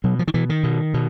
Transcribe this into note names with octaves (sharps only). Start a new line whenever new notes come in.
B2 F#3
F3
D#3
B2 E3
D#3
B2
B2